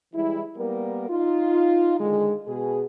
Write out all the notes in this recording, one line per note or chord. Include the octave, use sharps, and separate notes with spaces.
E3 G3 G#3 E4
G3 A#3 B3 A#4
D#4 F4
D3 D#3 G#3
B2 G#4